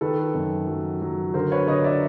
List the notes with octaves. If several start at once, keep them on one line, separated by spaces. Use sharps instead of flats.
D#3 A4 B4
F#2
F#3
F#3
D3 A#4 C5
B4 C#5
D3 C#5 D#5
D5 E5